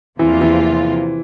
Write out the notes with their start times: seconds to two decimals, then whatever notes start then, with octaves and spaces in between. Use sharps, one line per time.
0.19 E2 C3 E3 F3 A#3 F4
0.41 E3